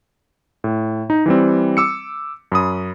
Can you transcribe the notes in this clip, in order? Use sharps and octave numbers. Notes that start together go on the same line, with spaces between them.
A2
D#4
E3 G3 C4
D6 E6 C#7
F#2 B5 D#6